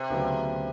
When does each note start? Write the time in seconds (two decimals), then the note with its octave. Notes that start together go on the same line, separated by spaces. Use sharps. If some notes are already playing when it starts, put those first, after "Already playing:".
Already playing: C3
0.10 D2 C#3 F#3 B3 D4